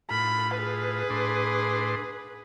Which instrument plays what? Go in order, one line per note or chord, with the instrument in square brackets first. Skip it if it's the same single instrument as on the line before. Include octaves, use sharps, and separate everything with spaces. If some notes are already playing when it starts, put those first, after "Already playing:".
[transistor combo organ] A2 F4 [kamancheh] B5
[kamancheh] G#4 B4
[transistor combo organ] A2 D4 C6